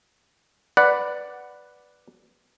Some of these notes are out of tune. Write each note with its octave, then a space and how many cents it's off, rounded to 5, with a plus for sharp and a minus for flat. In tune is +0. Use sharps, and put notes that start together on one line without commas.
B4 +0 D5 +0 F#5 +0